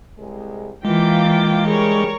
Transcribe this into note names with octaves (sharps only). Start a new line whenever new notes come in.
C2 G#3
E3 G#3 A#3 F4 G5 D6
D3 G3 G#4 A#4 C#5